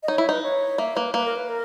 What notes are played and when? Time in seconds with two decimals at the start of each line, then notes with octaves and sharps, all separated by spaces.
0.03 D#5
0.08 D#4 C#5
0.18 E4
0.29 D#4 B4
0.43 C#5
0.78 A#3 E5
0.96 A#3 B4
1.14 A#3 B4
1.25 A#4
1.36 B4
1.49 A#4